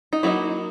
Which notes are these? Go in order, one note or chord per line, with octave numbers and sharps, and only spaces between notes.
D#4
F#3 A#3 D#4 E4